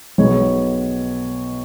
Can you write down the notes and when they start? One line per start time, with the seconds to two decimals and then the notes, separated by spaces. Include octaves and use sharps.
0.18 B1 B2 G#3 B3 C#5